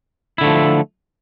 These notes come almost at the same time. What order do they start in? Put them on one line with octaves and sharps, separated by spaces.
E4 D3 A3 F3